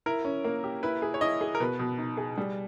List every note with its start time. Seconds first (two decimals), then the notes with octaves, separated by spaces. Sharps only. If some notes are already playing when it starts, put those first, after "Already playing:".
0.06 E4 A#4
0.25 C#4
0.44 A#3
0.64 G4
0.83 E4 B4
1.02 G#4
1.14 C#5
1.21 E4 D#5
1.41 G#4
1.55 A#4
1.60 B2 B4
1.79 B2
1.98 D#4
2.17 G#4
2.38 G3